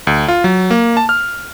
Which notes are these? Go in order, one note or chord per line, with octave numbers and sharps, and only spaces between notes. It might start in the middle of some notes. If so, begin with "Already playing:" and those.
D2
F4
F#3
A#3
A5
F6